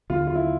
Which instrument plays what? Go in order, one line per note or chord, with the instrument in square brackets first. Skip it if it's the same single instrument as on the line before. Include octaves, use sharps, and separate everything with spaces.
[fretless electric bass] D#2 D3 F#3 B3 [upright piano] F4
[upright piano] F4
E4